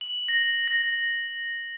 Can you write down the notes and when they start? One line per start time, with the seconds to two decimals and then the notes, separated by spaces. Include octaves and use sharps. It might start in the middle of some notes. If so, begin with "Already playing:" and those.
0.01 F#7
0.28 A#6
0.68 A#6